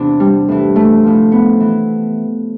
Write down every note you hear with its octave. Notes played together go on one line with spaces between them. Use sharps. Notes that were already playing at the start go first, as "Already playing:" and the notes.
Already playing: E2 C3 E3 D4
G3
A2 E3
A3
A2 F3
B3
E3